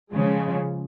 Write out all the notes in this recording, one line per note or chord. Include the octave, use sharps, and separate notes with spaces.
C#3 F3 G#3